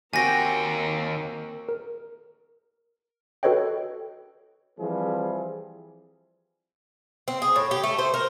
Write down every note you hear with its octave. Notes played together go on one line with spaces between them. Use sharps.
D#2 C4 F#4 G4 A#4 G5 G#5 A#6
A#4
F#4 A4 B4 C#5 D#5 G5
E3 F3 G3 C4 G#4
C4
G#4
A2
G4
A3
C5
A#4